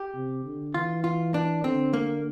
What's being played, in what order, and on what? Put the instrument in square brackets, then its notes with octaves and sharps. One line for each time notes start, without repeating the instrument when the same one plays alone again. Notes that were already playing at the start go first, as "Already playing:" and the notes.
Already playing: [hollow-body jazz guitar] G4
[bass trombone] C3
D3
[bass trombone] E3 [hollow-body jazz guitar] F4
[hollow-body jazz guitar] F4
D4
[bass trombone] D3 [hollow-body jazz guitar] C4
[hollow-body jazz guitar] A#3